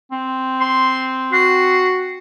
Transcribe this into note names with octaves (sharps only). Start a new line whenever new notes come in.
C4
C6
F#4 C7